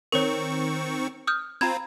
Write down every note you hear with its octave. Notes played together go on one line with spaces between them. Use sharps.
D#3 C4 A#4 C#5 C#6
D#6 F6 G6
C4 F4 A#5 B5 G#6